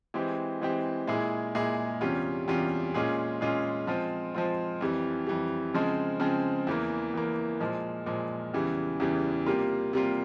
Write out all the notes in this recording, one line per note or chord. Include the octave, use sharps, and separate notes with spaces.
E3 G#3 C4 G4
E3 G#3 C4 G4
A#2 G#3 E4 G#4
A#2 G#3 E4 G#4
E2 C3 G3 C#4 F4
E2 C3 G3 C#4 F4
A#2 G#3 C#4 F4 G#4
A#2 G#3 C#4 F4 G#4
F3 G#3 C4 F4
F3 G#3 C4 F4
F2 E3 G3
F2 E3 G3
C#3 F3 G#3 C4
C#3 F3 G#3 C4
E2 E3 A#3
E2 E3 A#3
A#2 F3 G#3
A#2 F3 G#3
E2 C#3 E3 G3
E2 C#3 E3 G3
C3 G3 A#3 F4
C3 G3 A#3 F4